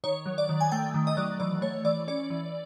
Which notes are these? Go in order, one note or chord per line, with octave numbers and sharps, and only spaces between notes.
D#3 C#5
F#3
D5
D#3
G#5
A3 G5
D#3
D#5
F#3 D5
E3 D5
A3 C#5
E3 D5
C#4 D5
E3